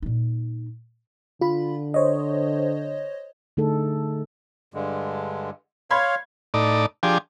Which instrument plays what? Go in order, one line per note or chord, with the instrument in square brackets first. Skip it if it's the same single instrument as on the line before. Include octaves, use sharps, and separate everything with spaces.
[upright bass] A#2 D#4
[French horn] D3 [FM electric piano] F4 B5
[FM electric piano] C5 C#5 D#5
[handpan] D3 A3 D#4 G#4 A4
[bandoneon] G2 D3 G#3
[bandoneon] C#5 F5 [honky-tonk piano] B5 C6 G#6
[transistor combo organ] A2 D#4 D5
F3 D4 G4 G#4